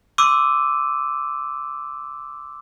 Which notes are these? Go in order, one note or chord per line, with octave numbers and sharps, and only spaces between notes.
C6 D6 E6 D#7